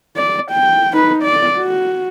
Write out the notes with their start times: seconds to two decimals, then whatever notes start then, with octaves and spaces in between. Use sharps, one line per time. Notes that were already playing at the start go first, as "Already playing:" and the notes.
0.17 D5
0.51 G5
0.93 D#4 B4
1.24 D5
1.58 F#4